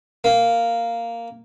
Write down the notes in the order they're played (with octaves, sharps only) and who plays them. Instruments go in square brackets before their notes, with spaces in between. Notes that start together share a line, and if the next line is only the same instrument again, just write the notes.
[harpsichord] A#3